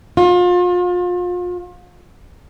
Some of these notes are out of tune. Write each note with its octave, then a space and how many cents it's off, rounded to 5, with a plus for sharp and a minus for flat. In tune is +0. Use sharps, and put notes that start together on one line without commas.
F4 +35